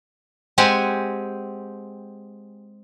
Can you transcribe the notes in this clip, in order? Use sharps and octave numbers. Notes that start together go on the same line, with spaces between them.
G#3 C4 G4 F#5 G#5